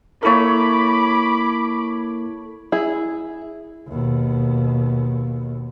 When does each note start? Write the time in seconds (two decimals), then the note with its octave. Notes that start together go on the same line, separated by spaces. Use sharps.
0.23 A#3 E4 A4 A#4 C#5 B5 D6
2.72 E4 G#4
3.88 D#2 B2